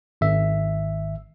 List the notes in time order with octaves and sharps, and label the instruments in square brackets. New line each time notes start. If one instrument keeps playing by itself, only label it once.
[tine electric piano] G#1 E5